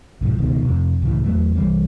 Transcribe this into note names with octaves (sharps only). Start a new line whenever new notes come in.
B1 G#2 E3 F3
D#1 C#2 B2 D#3
F2 C3
C#2 A2 C#3 E3
E2 F#3 A3
C2 E3 G3 A#3